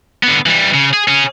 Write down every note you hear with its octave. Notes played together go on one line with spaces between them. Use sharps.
D3 B3
E3 G3
C#3
G#4
C#4 G#4